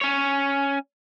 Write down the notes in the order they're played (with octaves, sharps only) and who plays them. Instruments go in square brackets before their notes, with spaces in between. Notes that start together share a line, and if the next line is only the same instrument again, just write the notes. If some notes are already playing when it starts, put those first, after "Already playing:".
[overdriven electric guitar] C#4 C#5